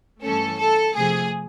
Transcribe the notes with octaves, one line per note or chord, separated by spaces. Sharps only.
G2 E3 A3 C#4 A4
A4
C3 F3 A3 G#4